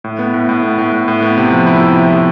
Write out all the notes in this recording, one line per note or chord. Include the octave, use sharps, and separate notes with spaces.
A2
B3
A2
A2
B3
A2
A2
A2
B3
C3
F3
E4
C3
F3
C3